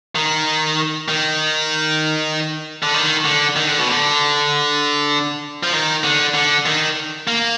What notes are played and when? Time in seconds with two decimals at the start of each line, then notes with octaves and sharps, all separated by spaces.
0.15 D#3
1.08 D#3
2.83 D3
2.94 D#3
3.25 D3
3.56 D#3
3.67 D3
3.78 B2
3.89 D3
5.63 F3
5.73 D#3
6.04 D3
6.34 D3
6.66 D#3
7.27 A#3